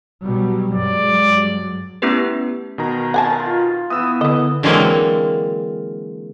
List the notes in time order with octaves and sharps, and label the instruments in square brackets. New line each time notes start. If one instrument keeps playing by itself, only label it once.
[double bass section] B2 F#3 G3
[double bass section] G2 F#3 G#3 [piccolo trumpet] D5
[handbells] A3 B3 C#4 E4 G4 B4
[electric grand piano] B2 D#3 A#5
[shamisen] F#5 G#5 A5
[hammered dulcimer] F4
[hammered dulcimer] E3 B3 [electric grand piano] D#6 E6
[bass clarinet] D3 [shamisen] B4 D#5
[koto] D3 E3 F#3 G#3 A#3 C4